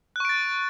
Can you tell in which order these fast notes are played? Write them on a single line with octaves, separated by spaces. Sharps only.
F#6 C#6 D7 A6